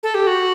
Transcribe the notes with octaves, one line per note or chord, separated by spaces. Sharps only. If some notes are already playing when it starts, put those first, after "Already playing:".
A4
G4
F#4